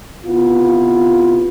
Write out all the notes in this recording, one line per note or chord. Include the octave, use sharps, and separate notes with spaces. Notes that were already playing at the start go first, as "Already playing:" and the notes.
C3 B3 E4 F4